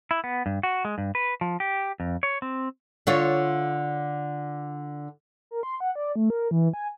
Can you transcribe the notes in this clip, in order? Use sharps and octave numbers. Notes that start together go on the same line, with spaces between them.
E4
B3
G2
F#4
G#3
G2
B4
F3
G4
F2
C#5
C4
D3 F4 C#5
A#4
C6
F#5
D5
A3
A#4
E3
G#5